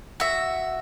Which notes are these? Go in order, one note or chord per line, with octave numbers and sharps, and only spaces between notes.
F#4 E5